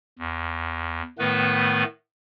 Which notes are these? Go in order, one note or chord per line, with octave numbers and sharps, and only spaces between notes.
E2
A2 D#3 A3 B3 B4